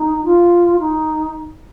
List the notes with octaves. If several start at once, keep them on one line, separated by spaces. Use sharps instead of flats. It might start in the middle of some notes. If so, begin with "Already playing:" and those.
Already playing: D#4
F4
D#4